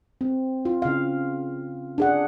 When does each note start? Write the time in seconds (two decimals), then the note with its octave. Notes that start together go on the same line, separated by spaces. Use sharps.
0.21 C4
0.65 F4
0.82 C#3 F5
1.98 D4 G#4 F#5